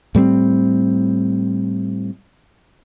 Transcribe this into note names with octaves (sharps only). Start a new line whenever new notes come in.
A2 G3 A#3 C4